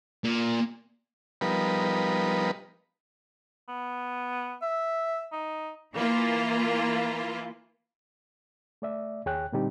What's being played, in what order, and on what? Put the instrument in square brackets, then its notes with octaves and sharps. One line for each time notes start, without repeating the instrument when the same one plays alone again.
[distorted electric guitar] A#2
[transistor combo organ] F3 G3 B3 D#4 A#4 B4
[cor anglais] B3
E5
D#4
[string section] E3 A#3 E4 F4
[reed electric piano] A3 D5 E5
D#2 G#4 C#5 G5 F#6
A#2 D3 G3 C4 D#4 G4